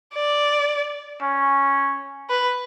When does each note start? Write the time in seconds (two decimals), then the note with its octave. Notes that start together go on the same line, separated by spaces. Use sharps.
0.15 D5
1.22 C#4
2.29 B4